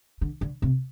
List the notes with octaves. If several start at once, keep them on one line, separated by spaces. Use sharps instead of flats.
D3
D3
C3